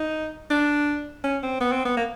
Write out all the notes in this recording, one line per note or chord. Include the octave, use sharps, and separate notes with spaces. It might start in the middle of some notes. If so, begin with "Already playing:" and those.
Already playing: D#4
D4
C#4
C4
B3
C4
B3
A#3